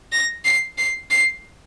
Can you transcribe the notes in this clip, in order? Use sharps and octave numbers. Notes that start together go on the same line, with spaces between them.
A#6
C7
C7
C7